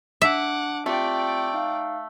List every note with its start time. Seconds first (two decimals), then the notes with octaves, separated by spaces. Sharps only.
0.22 D4 E5 F#5 D6
0.86 A3 C4 F4 G4 D5 G5
1.54 D#4 F5